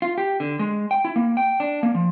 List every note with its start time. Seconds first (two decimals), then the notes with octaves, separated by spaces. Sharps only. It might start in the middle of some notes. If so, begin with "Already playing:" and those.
0.02 F4
0.18 G4
0.40 D3
0.59 G#3
0.91 G5
1.05 E4
1.16 A#3
1.37 G5
1.60 D4
1.83 A#3
1.95 F3